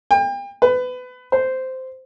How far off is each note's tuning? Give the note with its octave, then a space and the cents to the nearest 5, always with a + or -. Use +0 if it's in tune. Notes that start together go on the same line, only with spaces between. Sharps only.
G5 +35
B4 +25
C5 -10